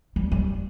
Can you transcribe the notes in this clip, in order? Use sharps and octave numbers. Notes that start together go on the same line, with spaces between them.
G3
G3